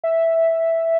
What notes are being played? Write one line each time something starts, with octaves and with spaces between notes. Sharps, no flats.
E5